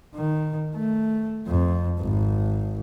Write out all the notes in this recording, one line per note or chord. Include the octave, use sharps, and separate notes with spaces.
D#3
A3
F2
G#1